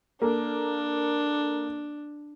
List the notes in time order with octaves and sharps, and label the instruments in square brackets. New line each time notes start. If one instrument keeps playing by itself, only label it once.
[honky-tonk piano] A#3 A4 [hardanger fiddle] D4